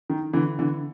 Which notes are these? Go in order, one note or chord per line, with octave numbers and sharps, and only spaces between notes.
D#3
D3 E3
D3 E3